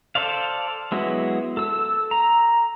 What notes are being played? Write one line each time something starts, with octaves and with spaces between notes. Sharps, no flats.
A4 C5 D5 F5
F#3 G#3 B3 E4 F#4
A4 E6
A#5